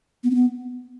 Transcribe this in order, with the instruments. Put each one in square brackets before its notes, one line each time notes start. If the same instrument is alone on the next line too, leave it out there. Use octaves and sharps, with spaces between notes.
[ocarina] B3
C4
B3